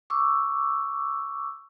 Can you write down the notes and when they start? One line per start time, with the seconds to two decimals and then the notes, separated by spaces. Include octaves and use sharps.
0.10 C#6 D6 E6